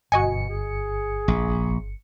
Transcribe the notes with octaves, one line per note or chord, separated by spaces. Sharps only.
G1 B2 F#4 D#5 G#5 C#7
G#4
A#1